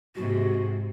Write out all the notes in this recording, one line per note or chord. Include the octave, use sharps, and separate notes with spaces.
G#2 C3 F#4